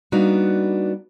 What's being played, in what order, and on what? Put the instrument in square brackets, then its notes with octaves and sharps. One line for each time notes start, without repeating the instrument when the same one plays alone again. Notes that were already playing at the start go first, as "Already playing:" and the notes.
[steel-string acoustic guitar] G3 A#3 B3 D4 D#4 F#4